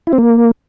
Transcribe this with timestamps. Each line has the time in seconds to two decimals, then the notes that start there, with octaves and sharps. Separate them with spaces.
0.07 E4
0.13 C4
0.18 A#3